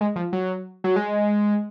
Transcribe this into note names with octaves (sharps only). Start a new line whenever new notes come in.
G#3
F3
F#3
F#3
G#3